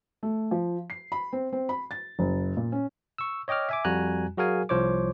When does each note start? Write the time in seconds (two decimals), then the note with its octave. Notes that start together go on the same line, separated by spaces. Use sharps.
0.23 A3
0.51 F3
0.90 C7
1.12 B5
1.33 C4
1.53 C4
1.69 B5
1.91 A6
2.19 F#1
2.57 A#2
2.72 C#4
3.18 C#6 E6
3.48 C#5 D#5 G5 D6 F6
3.69 E5 G#5 D6
3.85 F2 G3 F#4 G#5 A#5 F#6
4.37 F#3 F#4 G#4 A#4 F5 G#5
4.69 C2 F3 C5 C#5 D6